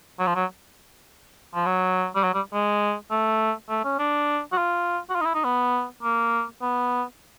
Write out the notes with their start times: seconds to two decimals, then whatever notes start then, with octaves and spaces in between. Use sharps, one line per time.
0.19 F#3
0.27 F3
0.35 F#3
1.54 F3
1.66 F#3
2.15 G3
2.23 F#3
2.34 G3
2.53 G#3
3.11 A3
3.69 A3
3.84 C#4
3.99 D4
4.52 F#4
4.57 F4
5.09 F#4
5.15 F4
5.21 D#4
5.25 E4
5.34 D#4
5.44 B3
6.03 A#3
6.62 B3